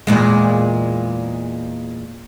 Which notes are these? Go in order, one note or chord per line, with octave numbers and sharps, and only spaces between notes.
E2 A#2 G#3